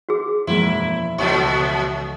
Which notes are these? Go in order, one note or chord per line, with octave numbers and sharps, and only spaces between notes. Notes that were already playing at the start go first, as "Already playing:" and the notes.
F#4 G#4
E1 F#2 F3 G#3 A#3 E4
C#2 A#2 F#3 A3 F4 C#6